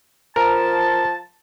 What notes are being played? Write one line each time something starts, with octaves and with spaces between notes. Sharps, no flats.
F3 A#4 A5